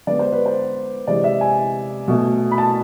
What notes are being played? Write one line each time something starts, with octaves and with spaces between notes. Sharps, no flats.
D3 G#3 B3 D5
C5
B4
C5
C3 E3 G#3 D5
E5
G#5
B2 A3
B5
A5